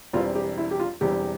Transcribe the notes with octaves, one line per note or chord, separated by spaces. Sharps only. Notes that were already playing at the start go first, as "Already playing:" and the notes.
E1 E2 E3 G3 C4 F4
G4
E4
G4
F4
E1 E2 E3 G3 C4 G4